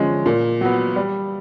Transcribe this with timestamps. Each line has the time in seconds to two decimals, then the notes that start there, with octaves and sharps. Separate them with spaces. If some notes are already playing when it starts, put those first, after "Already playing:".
Already playing: D3 F3 G#3 C#4
0.26 A#2
0.61 F#3 B3
0.96 G3